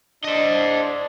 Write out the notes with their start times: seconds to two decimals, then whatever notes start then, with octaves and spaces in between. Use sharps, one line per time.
0.24 D4 C5 D#5